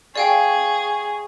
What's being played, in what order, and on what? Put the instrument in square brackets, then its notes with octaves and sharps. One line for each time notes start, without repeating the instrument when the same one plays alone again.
[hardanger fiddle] G#4 [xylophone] D5 F5 G5 [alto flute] C#6